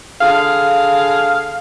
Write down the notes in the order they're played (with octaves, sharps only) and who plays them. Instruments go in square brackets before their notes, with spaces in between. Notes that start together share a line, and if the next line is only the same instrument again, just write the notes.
[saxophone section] D3 G#4 F5